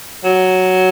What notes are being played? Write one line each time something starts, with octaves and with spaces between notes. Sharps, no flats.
F#3